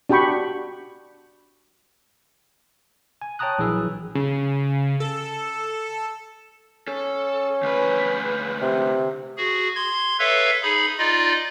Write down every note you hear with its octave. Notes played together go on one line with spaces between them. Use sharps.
D4 F#4 G4 G5 B5 C#6
G#5
C#5 G5 A5 A#5 D#6 F#6
A#1 E3 F#3 G#4 B4 E6
C#3
A4
C#4 A4
D2 B4
C3
F#4 G#4
C6 G#6
A4 B4 C#5 E5 F5
D#4 G#4 B5
D#4 F4 D5 D#5